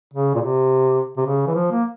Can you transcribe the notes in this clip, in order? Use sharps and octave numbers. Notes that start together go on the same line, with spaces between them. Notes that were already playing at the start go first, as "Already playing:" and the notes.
C#3
A#2
C3
C3
C#3
E3
F3
A#3